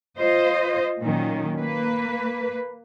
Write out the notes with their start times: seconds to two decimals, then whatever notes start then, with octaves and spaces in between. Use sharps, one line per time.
0.19 F4 C5 D#5
1.01 A#2 D#3 F#3 C#4
1.60 A#3 B4